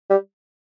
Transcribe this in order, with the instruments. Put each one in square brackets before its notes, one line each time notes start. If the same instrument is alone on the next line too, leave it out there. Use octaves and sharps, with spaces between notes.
[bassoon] G3